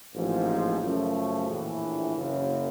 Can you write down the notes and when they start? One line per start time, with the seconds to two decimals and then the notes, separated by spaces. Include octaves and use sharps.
0.14 A1 G#2 F3 A#3
0.82 F#2 C#3 F3 A3
1.48 A#1 A2 E3
2.16 F#1 F#2 C#3